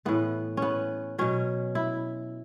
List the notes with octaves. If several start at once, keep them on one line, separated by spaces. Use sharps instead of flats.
A2 E3 B3
B3 C#4
B2 F#3 C#4
E4